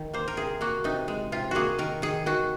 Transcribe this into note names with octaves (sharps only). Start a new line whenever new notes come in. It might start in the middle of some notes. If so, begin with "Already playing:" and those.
Already playing: D#3
A#3 C5
A#4
C3 G#4
A#3 F#4
C3 D#4
G#3
C3 F4
A#3 F#4 G#4
D#3 A#4
D#3 G#4
D#3 F#4